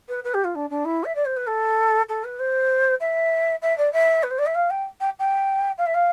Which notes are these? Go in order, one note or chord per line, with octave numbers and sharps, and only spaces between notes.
B4
B4
G4
F4
D4
D4
E4
E5
D5
C5
B4
A4
A4
B4
C5
E5
E5
D5
E5
B4
C5
D5
E5
F5
G5
G5
G5
F5
E5
F5